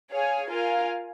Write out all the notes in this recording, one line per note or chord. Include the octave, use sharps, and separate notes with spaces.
G#4 C#5 F5 G#5
F4 A#4 F5 G#5